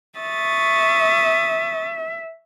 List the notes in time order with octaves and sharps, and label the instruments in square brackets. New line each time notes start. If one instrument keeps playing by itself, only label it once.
[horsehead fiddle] E5 [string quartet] C#6 D#6 A6